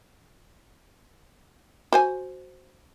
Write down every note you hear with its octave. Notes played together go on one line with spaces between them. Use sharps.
F#4 C5 G#5